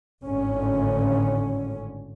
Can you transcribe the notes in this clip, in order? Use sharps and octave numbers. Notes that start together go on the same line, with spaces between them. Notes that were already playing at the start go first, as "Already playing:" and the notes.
G#1 A2 D3 C#4